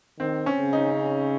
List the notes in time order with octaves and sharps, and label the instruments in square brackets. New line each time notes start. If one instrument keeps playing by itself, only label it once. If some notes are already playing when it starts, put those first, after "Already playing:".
[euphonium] D#3 [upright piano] C4
[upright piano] C#4
[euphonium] C#3
[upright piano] D#4